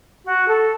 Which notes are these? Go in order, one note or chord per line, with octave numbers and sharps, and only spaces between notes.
F#4
A4